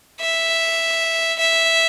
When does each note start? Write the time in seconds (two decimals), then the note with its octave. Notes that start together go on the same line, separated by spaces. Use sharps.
0.20 E5
1.39 E5